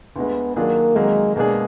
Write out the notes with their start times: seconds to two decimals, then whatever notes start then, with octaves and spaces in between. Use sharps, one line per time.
0.16 D2 D3 G#3 B3
0.56 D#3 F#3 A#3 D4 F4 G#4
0.95 F2 D#3 F#3 G#3 A#3
1.36 B2 G#3 A#3 D4 G#4